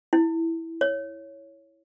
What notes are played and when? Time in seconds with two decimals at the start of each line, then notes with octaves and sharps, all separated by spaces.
0.13 E4
0.81 C#5